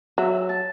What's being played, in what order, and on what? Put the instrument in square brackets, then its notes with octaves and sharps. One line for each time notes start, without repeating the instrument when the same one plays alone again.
[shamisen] F#3 [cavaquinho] E5
[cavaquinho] A5